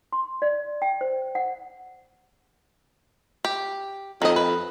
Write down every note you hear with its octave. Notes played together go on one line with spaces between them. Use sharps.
C6
D5
G5
C5
F#5
G4
F2 D#3 D#5
B4